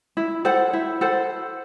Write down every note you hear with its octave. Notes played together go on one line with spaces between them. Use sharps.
E4
A4 C5 F#5
E4
A4 C5 F#5